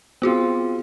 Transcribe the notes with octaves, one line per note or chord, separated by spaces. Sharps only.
B3 C4 F4 F#4 G#4